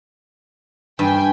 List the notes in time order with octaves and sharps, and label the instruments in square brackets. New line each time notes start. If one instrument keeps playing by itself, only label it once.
[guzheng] G2 [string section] G5 G#5